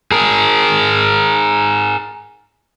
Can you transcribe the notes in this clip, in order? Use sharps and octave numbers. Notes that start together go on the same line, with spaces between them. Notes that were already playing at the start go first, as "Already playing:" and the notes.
G#4 A#4